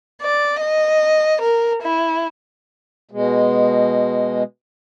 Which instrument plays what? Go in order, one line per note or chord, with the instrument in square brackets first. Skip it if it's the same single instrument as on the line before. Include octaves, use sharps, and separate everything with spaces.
[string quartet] D5
D#5
A#4
E4
[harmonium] B2 G#3